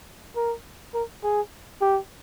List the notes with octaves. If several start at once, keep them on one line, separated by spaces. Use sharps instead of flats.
A#4
A#4
G#4
G4